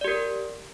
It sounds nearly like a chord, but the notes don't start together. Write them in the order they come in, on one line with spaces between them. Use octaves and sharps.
D5 G4 A#4